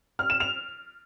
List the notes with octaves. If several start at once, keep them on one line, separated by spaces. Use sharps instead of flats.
F6
E7
F7